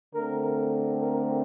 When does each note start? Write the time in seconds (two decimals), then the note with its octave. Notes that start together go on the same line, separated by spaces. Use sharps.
0.14 D3 A3 C4 A#4
0.99 A#4